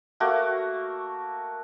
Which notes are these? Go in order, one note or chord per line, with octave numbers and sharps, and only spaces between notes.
A3 A#3 F#4